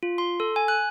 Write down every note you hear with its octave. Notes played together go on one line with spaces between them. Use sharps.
F4
C6
A4
G#5
F#6